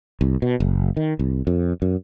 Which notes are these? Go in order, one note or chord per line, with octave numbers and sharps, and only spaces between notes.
C2
B2
F#1
D#3
C2
F2
F#2